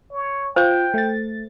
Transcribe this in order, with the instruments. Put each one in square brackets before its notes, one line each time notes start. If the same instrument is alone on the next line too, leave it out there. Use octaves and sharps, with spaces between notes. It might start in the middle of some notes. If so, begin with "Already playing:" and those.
[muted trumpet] C#5
[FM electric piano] F4 G6 [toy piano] C5 [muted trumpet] G5
[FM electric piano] A3 A6